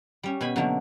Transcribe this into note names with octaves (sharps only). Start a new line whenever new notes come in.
G3 C#4
B2 G#5 B5
B2 D3 F#3 A3 A#3